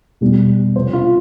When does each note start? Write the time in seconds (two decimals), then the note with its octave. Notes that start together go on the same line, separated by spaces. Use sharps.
0.21 B2 G3
0.76 C3 F3 C5
0.93 F4